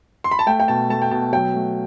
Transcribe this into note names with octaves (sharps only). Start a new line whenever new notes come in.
C6
B5
A5
A3 G5
G5
B2 A5
A3 A5
G5
B2 A5
F#3 G5
A3